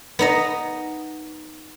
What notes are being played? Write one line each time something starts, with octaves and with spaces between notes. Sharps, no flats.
B3 D#4 D#5